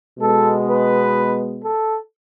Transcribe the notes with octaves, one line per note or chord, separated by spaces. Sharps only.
B2 G#3 B3 A4
B4
A4